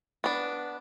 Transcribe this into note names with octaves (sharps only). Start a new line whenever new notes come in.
B3 D4